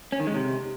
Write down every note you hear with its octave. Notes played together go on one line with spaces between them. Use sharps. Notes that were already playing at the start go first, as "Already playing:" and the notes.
C#4
D#3
G#3
C3